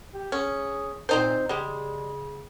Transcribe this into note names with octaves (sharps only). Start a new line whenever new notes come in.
G4
C#4 G#4
A#2 C4 D#4 C5
C#3 G3 G#3